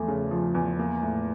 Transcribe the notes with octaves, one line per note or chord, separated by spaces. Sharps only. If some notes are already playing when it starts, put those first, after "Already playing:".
Already playing: E2 F3 A3
C#3
F3
E2
A#3
A2